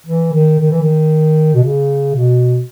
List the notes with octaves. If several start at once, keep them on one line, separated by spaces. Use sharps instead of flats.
E3
D#3
D#3
E3
D#3
B2
C#3
B2